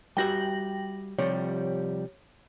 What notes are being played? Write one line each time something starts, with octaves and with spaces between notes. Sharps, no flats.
G3 F#4 E5 G5 A#6 F#7
C3 F3 G3 C#5